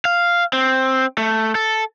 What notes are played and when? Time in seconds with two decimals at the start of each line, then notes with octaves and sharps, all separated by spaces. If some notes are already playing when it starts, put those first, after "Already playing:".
0.05 F5
0.53 C4
1.18 A3
1.55 A4